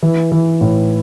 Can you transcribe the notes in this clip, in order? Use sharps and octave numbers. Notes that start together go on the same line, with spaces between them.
E3
E3
A2